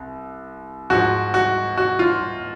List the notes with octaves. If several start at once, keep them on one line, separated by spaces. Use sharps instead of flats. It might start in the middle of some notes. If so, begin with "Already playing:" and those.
Already playing: C2
G#2 F3 F#4
F#4
F#4
F4